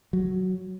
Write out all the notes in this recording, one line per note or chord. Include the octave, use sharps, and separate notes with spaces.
F#3